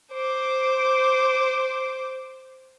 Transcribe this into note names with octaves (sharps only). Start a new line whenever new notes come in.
C5 D6